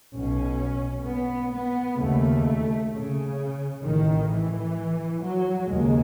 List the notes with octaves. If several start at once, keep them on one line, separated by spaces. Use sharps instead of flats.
B1 B2 C#4
B3
B3
D#2 C#3 A3
C#3
A1 A2 D#3
E3
F#3
D#2 C#3 G#3